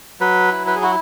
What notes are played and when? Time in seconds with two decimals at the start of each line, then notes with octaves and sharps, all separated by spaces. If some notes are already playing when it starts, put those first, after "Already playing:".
0.20 F#3 B4
0.51 E4
0.67 B4
0.75 G#4
0.82 E4 F#4